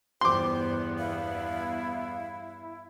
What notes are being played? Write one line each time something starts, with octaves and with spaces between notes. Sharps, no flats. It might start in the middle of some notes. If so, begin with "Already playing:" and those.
E2 G2 B3 G4 C5 C6 D6
E4 F5